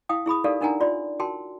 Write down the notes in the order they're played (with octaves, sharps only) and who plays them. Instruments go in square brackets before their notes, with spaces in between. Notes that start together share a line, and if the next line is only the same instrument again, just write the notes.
[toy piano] E4 F5 G5 D#6
E4 G#4 B5 D#6
D#4 G4 A4 A#4 D5 F5
D4 D#4 A#4 F#5 G#5 A#5
F4 D5 C6
F#4 A#4 G5 A5 C6